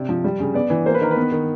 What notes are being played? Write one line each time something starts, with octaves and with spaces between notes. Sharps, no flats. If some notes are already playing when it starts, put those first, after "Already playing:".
Already playing: C3 D5
F3
G3
C#3
B3 D5
E3
A#3 C5
B4
D#3 A#4
B4
B3
D#3